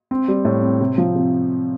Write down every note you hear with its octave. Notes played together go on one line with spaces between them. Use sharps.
C4
G3
A2
C4
C3
F3
C3